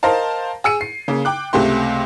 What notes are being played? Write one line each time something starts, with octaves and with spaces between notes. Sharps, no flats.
A#4 C5 D#5 F5 A5
G#4 E6 C#7 D#7
C7
C#3 A#3
G5 D6 F#6
C#2 C3 A3 G4 C6